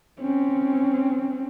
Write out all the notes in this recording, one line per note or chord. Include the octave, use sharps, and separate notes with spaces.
C4 C#4